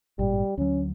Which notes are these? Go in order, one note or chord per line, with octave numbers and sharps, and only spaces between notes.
G#1 G2 A#2 G3
D2 F#3 C#4